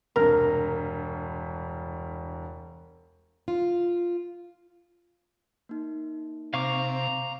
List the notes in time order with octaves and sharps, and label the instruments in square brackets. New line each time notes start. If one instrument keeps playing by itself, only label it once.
[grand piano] E1 C2 G2 [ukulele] A#4
[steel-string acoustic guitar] F4
[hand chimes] A#3 D#4
[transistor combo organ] C3 [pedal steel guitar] F5 C#6 D6 [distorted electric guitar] A#5